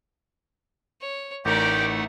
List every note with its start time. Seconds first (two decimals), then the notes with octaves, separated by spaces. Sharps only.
1.01 C#5
1.45 A1 A3 D#4 G4 A#4 D5 F#5